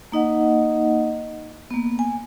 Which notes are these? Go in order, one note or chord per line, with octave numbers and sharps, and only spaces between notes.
A#3 D#4 D#5 F#5
A#3 B3
G#5